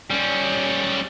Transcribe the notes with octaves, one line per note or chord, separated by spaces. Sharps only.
G3 C#4